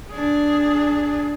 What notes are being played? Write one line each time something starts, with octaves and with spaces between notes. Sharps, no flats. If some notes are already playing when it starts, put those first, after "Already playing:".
D4 G#4